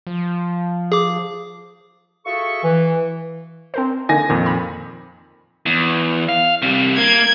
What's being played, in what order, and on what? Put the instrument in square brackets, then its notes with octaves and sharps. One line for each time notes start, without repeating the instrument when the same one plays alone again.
[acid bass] F3
[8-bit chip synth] G#4 D6
[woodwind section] F4 F#4 G#4 A4 E5 C#6
E3
[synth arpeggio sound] C4 A#4 C5
[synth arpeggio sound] D3 A#3 D#4 [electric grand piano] G#5 A#6
[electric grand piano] F2 A#2 D#3
[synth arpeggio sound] B5
[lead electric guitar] E2
F5
C3 G3
[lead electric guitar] A#3 [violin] G#6